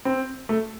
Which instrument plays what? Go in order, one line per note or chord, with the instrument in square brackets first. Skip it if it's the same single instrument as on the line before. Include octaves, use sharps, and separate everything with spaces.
[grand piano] C4
A3